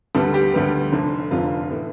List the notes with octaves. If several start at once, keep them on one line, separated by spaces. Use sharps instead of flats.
D2 D3 G3 B3 A4
G4
D2 D3 G3 B3
F1 F2 D3
F1 F2 D3 F4
A2 E3 B3